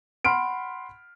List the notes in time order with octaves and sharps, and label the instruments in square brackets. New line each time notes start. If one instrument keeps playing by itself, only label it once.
[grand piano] F#5 B5 C6 F6 D7